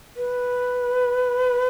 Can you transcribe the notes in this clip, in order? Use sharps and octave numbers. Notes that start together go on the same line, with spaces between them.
B4